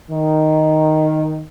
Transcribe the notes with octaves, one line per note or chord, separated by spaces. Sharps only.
D#3